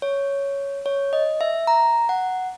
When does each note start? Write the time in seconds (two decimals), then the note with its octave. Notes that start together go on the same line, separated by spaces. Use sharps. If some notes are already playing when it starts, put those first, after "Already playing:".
0.02 C#5
0.86 C#5
1.13 D#5
1.41 E5
1.67 A#5
2.09 F#5